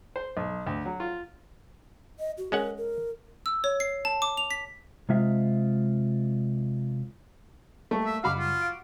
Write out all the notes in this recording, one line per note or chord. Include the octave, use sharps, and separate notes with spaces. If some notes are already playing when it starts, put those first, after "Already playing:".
C5
B1
D2
F#3
F4
D#5
F#4
G#3 C#4 A#4 F#5
A#4
E6
C#5
C7
A5
D6
F7
B6
C3 G#3 F4 E5
G3 A3 A#3 C#6
E5
F#2 C#3 G3 F#4 F5 B5 D6
F4
F5 D7